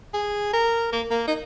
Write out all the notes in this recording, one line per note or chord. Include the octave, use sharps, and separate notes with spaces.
G#4
A#4
A#3
A#3
D#4